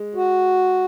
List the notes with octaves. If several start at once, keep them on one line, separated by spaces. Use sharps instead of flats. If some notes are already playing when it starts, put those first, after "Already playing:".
Already playing: G#3
F#4